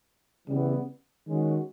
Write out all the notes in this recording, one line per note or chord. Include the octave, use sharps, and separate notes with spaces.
C#3 E3 G3 B3
D#3 G#3 C#4 F#4